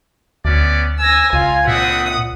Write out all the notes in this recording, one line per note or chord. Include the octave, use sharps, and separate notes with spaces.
D2 B3 C#4 D5
G#5 E6 A#6
C#2 F4
A#2 C4 D4 E5 F#5 D#6